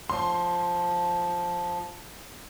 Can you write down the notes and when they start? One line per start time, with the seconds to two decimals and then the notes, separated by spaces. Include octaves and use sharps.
0.10 F3 C6